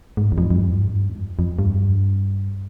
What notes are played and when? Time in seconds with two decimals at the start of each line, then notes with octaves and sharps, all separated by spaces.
0.17 G#2
0.32 E2
0.38 F2
0.50 F2
0.58 G2
0.79 G#2
0.98 G2
1.09 E2
1.18 F2
1.39 F2
1.59 G2